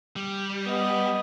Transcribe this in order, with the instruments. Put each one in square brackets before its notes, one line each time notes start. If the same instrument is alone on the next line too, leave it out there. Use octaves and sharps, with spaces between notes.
[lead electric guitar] G3
[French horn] B3 [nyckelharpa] D#5